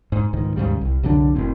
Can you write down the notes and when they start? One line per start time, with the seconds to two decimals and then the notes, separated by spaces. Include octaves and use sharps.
0.12 G#2
0.33 C#2 G#2 D#3
0.56 D#2 G#2 C#3 G3
0.81 C2
1.03 C2 F#2 D3 D4
1.35 F#1 A2 C4